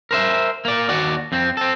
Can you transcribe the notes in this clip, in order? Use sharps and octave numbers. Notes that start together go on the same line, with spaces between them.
A#4 C5 E5
A#3 D5
D#2 F#4 D5
F2 C4
C4 A4